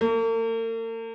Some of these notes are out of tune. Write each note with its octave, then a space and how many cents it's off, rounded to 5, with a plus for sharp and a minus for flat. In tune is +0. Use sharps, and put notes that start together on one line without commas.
A#3 -45